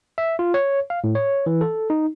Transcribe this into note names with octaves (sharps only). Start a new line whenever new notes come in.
E5
F4
C#5
F5
A2
C#5
E3
A4
D#4